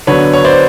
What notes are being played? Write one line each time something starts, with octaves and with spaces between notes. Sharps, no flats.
D3 F#3 B3 D4 B4 C#5
C#5
C5 D5